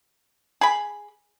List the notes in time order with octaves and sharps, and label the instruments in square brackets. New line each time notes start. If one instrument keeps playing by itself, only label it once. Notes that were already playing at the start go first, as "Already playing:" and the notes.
[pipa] G#4 B5